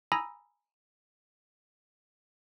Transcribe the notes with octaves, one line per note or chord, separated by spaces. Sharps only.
G#5 A#5 B5 D#6 E6 A#6